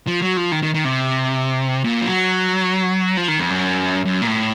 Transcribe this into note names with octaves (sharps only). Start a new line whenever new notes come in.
F3
F#3
F3
D#3
D#3
D#3
C3
A#2
F3
F#3
F3
D#3
F2
F#2
F#2
A#2
A2